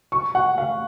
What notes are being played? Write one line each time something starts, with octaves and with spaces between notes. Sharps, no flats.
C#6
F#5
F5